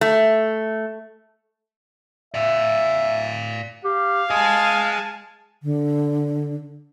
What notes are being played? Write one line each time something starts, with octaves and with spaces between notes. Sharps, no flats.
A3
D5 E5 F5
G4 F5
G#4 D#5 G#5 A5 D#6
D3